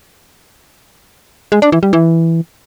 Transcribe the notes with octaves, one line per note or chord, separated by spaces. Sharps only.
G#3
D4
E3
G3
E3